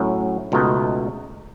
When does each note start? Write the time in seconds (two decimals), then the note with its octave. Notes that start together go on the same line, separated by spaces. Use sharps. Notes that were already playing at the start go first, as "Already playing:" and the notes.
Already playing: A2 F#3 C#4 E4
0.52 C#2 B2 A3 D#4